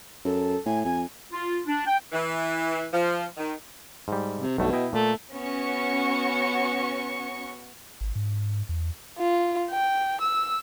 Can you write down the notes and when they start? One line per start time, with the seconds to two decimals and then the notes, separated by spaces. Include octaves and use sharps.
0.25 F#2 A4
0.66 A2 G#5
0.85 F2 G#5
1.32 F4
1.66 D4
1.86 G5
2.12 E3
2.92 F3
3.37 D#3
4.08 G#2 G3
4.39 C3
4.58 B1 G2 B2 A3
4.73 E4 D#5 G5
4.93 A#2 A3
5.35 B3 C#4 F#4 C#6 C#7
8.01 G#1
8.15 G#2
8.69 E2
9.19 F4
9.70 G5
10.21 E6